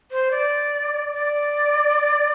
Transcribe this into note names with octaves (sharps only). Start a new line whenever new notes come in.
C5
D5
D5